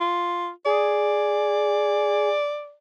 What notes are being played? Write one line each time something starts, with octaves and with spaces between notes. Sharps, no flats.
F4
G#4 D5